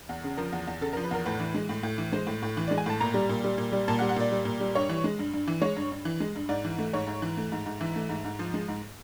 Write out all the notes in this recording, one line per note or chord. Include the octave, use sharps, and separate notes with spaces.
E2
C#3
F3 A#4
E2
E2
C#3 A4
A#4
F3
B4
E2 A#4
A2 B4
E3
G#3
A2
A2
E3
G#3 C5
A2
A2
E3
D5
G#3
G#5
A2 A5
A#2 A#5
G3
A#2
G3
A#2
G3
A#2 A5
F#5
G3
F#5
A#2 D5
G3
A#2
G3
G2 C#5
E3
G#3
G2
G2
E3
G#3 C#5
G2
G2
E3
G#3
G2
G#2 D5
E3
A3
G#2 C#5
G#2
E3
A3
G#2
G#2
E3 E5
A3
G#2
G#2
F3
G#3
G#2